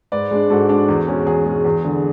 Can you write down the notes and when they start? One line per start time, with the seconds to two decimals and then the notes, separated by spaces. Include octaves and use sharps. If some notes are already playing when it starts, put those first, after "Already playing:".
0.12 G#2 B4 D5
0.31 G#3 D4
0.50 G#2 F#4 A4
0.69 G#3 D4
0.89 E2
1.08 B2 G#3 C#4
1.26 E2 G#4
1.46 B2 G#3 C#4
1.65 E2
1.84 D3 G#3 D4